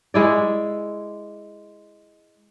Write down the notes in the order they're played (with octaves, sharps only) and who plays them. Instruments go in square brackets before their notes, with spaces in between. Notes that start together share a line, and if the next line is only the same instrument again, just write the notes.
[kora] G#3 E4 D5